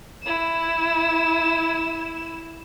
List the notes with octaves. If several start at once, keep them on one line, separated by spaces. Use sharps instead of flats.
E4 E7